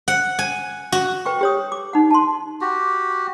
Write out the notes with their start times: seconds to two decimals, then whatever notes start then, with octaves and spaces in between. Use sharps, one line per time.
0.08 F#5
0.39 G#5
0.92 F#4
1.26 B4 G5 C#6
1.41 G4 C#5 D#6
1.72 D6
1.93 D#4 F#5
2.11 A5 C6
2.61 F#4 G4